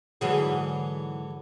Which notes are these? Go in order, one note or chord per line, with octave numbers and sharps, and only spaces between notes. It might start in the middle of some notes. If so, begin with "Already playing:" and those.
G#2 D3 E3 F#3 G#4